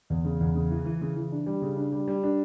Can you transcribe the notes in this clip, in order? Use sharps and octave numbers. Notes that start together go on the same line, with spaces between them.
E2
C#3
E2
C#3
E3
E3
C#3
E3
D4
G3
C#3
D4
G3
G3
D4